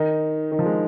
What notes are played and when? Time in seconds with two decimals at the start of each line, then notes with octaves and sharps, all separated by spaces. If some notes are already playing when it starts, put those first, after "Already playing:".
Already playing: D#3 D#4
0.52 D#3
0.59 F3
0.66 G#3